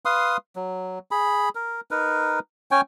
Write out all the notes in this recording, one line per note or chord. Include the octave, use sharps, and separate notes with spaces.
B4 F5 C6 D#6
F#3
G#4 B5
A#4
D#4 A#4 B4
C#4 C#5 G5 G#5